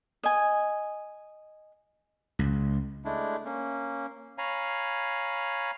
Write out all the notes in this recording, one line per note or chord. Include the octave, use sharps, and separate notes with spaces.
D#5 G#5
C#2
G#3 A3 D4 E4
A#3 C#4
C#5 F5 G#5 A#5 B5